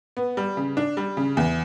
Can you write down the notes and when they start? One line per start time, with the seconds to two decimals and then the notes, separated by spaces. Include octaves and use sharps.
0.17 B3
0.37 G3
0.57 C#3
0.77 D4
0.97 G3
1.17 C#3
1.37 E2